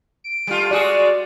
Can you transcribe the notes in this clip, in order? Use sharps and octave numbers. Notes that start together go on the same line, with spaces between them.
D7
G3 A3 F4
G#3 F#4 G#4 D5